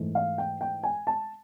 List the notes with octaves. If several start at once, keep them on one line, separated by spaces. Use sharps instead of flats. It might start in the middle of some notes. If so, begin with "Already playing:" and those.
Already playing: G#2 E3 A3
F5
G5
G5
G#5
A5